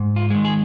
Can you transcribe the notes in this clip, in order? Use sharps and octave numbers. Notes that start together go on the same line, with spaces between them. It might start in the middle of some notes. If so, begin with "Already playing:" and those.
Already playing: G#2
F4
D#3 G#3
G#4